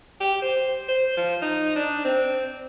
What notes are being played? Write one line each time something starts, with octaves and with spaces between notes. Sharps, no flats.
G4
C5
C5
F3
D#4
D4
C4